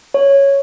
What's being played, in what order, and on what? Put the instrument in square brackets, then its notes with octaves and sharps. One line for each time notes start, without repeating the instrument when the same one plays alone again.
[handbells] C#5